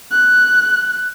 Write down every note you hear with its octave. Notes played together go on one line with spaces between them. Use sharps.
F#6